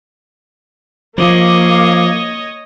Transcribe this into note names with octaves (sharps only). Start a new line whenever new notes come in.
F3 A#3 C#5 D#5 F5 D6